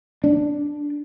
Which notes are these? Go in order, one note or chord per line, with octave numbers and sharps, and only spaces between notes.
D4